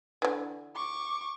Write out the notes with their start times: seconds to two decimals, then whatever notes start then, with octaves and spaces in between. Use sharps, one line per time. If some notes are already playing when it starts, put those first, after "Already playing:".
0.22 D3 E3
0.76 C#6 D6